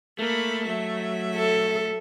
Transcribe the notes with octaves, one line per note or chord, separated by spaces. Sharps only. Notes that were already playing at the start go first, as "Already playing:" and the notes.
A3 A#3 B5
F#3 E5
A4